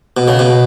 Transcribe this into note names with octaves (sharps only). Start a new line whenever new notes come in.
B2
C#3
B2